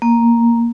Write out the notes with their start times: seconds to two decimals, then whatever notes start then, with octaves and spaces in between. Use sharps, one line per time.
0.02 A#3